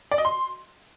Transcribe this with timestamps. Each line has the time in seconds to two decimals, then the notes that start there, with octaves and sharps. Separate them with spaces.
0.12 D5
0.18 D#5
0.25 C6